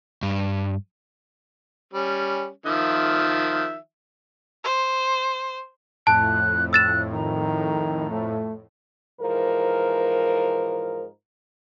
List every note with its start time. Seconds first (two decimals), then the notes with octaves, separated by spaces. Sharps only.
0.23 G2
1.94 G3 C#4
2.66 D#3 F3 E5
4.64 C5
6.07 F2 A2 A5 F#6
6.73 E6 F#6 A6 E7
7.13 D#3 A#5
8.11 A3
9.21 G#2 E3 F3 A#4